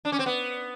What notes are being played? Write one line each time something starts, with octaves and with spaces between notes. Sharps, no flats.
D4
C#4
C4
B3